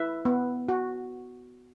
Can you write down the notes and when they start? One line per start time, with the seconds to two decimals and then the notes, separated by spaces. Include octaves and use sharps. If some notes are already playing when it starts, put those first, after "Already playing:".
Already playing: E4 B4 E5
0.25 B3
0.69 F#4